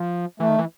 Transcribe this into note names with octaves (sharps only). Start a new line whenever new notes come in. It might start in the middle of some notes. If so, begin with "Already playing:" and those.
Already playing: F3
E3 A3
D#3
E3